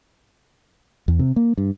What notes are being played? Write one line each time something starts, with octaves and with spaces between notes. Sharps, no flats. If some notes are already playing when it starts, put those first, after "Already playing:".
E2
C3
A#3
G2